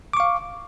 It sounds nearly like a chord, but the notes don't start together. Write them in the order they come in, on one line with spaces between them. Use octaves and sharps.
D6 C#6 F5